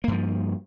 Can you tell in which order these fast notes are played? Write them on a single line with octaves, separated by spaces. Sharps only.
A#3 G2 F3